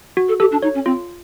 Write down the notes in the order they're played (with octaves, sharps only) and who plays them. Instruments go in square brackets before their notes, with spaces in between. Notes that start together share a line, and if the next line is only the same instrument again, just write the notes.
[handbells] F#4
[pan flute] A4
[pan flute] G4 [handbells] A4
[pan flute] D4
[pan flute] D#4 [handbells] C#5
[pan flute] C#4
[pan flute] C4 [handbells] F4